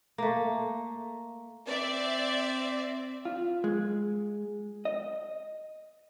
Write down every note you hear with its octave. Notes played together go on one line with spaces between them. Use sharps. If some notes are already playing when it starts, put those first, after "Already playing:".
A3 A#3
C4 D5 E5
F4
G#3
D#5